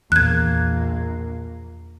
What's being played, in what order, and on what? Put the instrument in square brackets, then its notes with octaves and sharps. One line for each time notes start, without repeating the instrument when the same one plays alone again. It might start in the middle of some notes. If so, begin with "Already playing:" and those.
[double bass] A#1 A#3 [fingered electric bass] E2 [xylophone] F#6 G#6